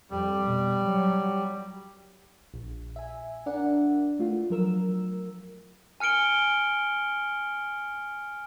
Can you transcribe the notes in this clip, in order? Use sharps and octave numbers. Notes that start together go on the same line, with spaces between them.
F2 G3
B2
F#3
A#1
E5 G#5
D4 A#4 D5 F#5
A3 F4
F3 F#3 A#4 E6
G#5 F6 C#7 D7 G7